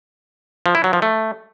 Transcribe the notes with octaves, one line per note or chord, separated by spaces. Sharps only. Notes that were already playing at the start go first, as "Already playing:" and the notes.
F3
E4
F#3
F3
A3